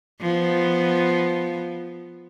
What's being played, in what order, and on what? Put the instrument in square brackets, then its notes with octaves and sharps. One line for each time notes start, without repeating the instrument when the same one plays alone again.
[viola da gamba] F3 B3